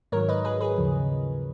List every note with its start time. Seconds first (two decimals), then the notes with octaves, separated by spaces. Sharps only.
0.12 G#2 D#3 F#3 A#4 C#5
0.28 B4 D#5
0.45 G#4 B4
0.61 G#4 B4
0.78 D#2 C#3 F3